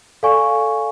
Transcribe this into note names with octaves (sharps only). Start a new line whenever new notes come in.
A4 D5 F5 G#5 C#6